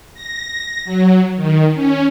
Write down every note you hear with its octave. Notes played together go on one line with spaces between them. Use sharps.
A#6
F#3
D#3
C#4